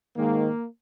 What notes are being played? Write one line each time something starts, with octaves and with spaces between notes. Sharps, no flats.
G#2 D#3 A#3